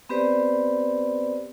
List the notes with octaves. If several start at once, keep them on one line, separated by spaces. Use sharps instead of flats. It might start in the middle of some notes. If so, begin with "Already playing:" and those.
B3 C4 G4 B4 C5 D5